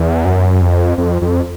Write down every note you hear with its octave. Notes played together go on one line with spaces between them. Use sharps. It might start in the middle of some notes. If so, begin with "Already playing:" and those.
Already playing: E2
F#2
F2
F2
F2